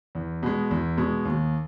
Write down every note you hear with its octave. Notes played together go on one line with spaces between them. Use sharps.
E2
B2 G#3
E2
B2 G#3
D#2